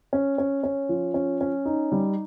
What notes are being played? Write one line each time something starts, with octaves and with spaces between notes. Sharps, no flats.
C#4
C#4
C#4
F3
C#4
C#4
D#4
G3